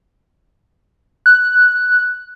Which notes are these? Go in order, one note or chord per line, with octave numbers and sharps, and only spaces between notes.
F#6